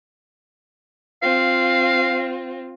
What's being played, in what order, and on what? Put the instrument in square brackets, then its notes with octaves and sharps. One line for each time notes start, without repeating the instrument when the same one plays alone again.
[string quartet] C4 F4 [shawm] F5